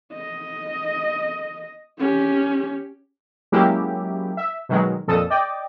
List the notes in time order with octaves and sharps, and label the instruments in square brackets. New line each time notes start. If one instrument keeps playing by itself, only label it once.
[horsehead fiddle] D#5
C#4 G4
[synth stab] F#3 G#3 A#3 C#4 E4 G4
E5
B2 D#3 F#3 G#3
A#1 F2 A#2 A4 A5 D#6
D5 D#5 G5 D6